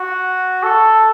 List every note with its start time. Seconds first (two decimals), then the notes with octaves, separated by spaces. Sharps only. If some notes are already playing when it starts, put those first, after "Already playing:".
Already playing: F#4
0.63 A4